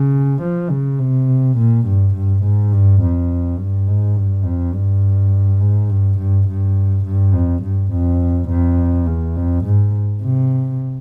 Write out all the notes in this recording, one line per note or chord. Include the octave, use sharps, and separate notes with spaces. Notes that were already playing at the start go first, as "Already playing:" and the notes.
Already playing: C#3
F3
C#3
C3
A#2
G2
G2
G#2
G2
F2
G2
G#2
G2
F2
G2
G#2
G2
G2
G2
G2
F2
G2
F2
F2
E2
F2
G#2
C3